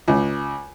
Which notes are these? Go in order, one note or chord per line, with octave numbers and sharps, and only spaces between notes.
C#2